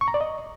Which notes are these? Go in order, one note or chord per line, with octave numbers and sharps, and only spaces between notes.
C#6
A#5
D5
D#5